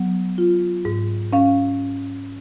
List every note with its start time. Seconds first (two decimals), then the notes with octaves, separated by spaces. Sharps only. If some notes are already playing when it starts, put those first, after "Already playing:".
Already playing: F#3 B3
0.38 F4
0.85 G#2
1.33 C#4 F5